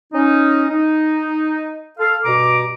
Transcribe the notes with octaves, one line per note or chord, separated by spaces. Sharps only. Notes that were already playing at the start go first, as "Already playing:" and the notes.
C#4 D#4
D#4
A4 F5
G2 B2 A#5 D6